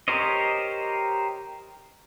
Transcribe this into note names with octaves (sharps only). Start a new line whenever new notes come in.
G4 A#4 C5 C#5 D#5